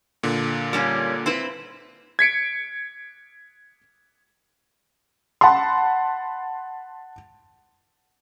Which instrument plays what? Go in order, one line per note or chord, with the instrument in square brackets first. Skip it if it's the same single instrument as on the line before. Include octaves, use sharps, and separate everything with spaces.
[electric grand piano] A#2 D3
[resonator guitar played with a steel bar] G3 A#3 C#4
C4 E4 B4
[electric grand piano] G#6 B6 C#7 D7
[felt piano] F#5 A5 B5 C6